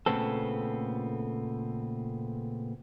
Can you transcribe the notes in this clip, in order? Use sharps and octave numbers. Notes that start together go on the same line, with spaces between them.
A#2 C#3 A3 B3 C4 A4